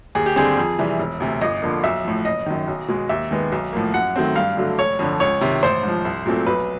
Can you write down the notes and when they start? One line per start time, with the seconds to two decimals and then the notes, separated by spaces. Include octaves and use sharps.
0.15 D#2 G#4
0.26 G4
0.36 D3 G3 C4 G#4
0.57 F2
0.79 C3 E3 G3
0.99 E1
1.20 D2 C3
1.41 G1 D#5
1.62 F2 D3 F3 A#3
1.84 B1 E5
2.05 A2 F3
2.25 F#1 D#5
2.46 F#2 D#3
2.67 B1
2.88 B2 G#3
3.09 D#2 E5
3.31 D#3 G#3 B3
3.52 B1
3.73 A2 F3 A#3
3.94 F#2 F#5
4.16 D#3 F#3 A3 C4
4.35 G2 F5
4.57 D3 F#3 A3
4.78 F1 C#5
4.99 F2 D3 F3
5.20 C#2 C#5
5.41 C3 D#3
5.63 A1 C5
5.83 G#2 F3
6.05 C2
6.26 A#2 F#3 A3 C4
6.47 B1 B4